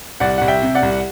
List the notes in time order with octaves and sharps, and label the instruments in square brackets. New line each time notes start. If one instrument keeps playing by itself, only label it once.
[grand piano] C2 D5 F#5
C2 F#5
E5 G5
C3
D5 F#5
C2